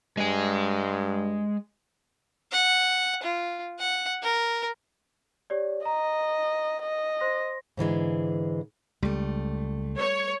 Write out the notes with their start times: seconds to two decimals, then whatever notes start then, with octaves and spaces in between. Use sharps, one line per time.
0.17 G2 G#3 G#5
2.51 F#5
3.23 F4
3.79 F#5
4.23 A#4
5.50 G4 C#5 D5
5.85 D#5 A#5
6.82 D#5
7.20 C5 C6 A#6
7.77 G#2 D3 E3 G#3
9.03 C#2 G3 A3
9.97 C#5